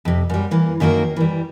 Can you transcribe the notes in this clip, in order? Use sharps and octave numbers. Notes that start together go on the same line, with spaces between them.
F2 C3
F#2 G3
E3 A#3
F#2 D#3 A#3 F#4 A4 A#4
E3 G3